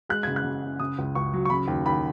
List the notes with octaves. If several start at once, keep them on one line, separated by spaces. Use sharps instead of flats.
G#3 F#6
C#3 G#6
F#6
C#3
C#4
C#3 D#6
C#2
C#2 C#6
F#3
C#6
C#3 B5
D#2
D#2 B5